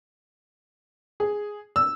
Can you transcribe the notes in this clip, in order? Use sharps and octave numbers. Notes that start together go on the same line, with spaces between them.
G#4
E6